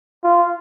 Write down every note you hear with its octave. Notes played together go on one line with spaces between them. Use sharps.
F4